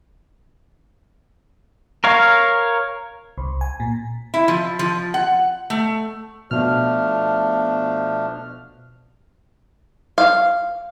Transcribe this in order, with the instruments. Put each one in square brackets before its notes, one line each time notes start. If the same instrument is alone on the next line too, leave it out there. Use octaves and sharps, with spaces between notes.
[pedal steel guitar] A#4 C#5 F5
[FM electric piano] C2
G#5
A#2
[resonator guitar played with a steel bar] E4
F3
F3
F#5
A3
[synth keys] B2 F6 [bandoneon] F3 A3 D4
[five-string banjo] F5